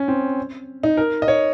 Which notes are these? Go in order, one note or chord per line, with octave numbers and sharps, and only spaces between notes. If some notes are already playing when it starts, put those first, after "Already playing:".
Already playing: C#4
C4
D#4
A#4
D#5
C#5